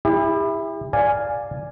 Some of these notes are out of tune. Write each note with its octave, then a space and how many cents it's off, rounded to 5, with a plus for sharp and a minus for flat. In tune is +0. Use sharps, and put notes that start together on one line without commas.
E4 +0 G4 +40
D5 +0 F5 +0 G#5 +0